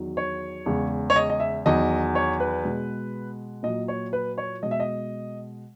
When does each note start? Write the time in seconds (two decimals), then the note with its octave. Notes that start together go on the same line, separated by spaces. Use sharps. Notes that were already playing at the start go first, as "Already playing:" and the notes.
Already playing: E2 D#3 F#3
0.17 C#5
0.66 E2 C#3 G#3
1.10 C#5
1.16 D#5
1.30 D#5
1.40 E5
1.65 E2 D#3 F#3 D#5
2.15 C#5
2.40 B4
2.64 B2 G#3
3.63 A#2 F#3 D#5
3.88 C#5
4.13 B4
4.38 C#5
4.63 B2 G#3 D#5
4.71 E5
4.80 D#5